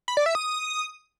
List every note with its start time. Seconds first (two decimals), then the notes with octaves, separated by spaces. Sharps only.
0.08 B5
0.17 D5
0.26 E5
0.35 D#6